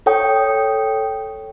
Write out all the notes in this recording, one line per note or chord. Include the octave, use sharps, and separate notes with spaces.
A4 C#5 G5 D#6